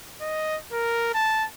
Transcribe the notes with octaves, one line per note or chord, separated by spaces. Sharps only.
D#5
A#4
A5